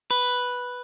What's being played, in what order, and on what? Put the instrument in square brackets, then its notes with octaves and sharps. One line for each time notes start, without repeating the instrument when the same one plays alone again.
[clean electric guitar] B4